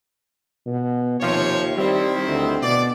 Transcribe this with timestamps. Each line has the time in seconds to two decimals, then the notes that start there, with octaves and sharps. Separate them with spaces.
0.66 B2
1.21 D#2 C3 F3 C#5
1.77 D#3 G3 C4 E4
2.27 D2
2.62 B2 D5